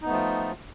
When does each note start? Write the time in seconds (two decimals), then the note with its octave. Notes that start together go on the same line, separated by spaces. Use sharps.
0.02 D#4
0.05 B3
0.08 A3
0.11 F3
0.14 F4